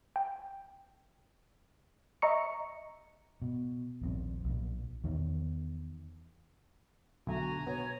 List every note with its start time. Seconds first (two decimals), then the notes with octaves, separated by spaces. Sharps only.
0.16 G5
2.22 D#5 E5 A#5 C#6 C#7
3.42 B2
4.01 D#1 A#1 C4
4.44 B1 A#2
5.04 E2 D#3
7.27 B1 D3 A3 F#4 G#5 A#5
7.67 B2 B3 C#5